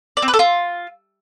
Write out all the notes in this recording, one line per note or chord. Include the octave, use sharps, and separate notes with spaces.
D5
C4
B4
A4
F4